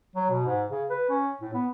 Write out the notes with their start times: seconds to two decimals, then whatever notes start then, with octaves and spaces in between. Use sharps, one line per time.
0.15 F#3
0.30 B2
0.45 G#2
0.70 C#3
0.90 B4
1.10 C#4
1.41 A2
1.54 B3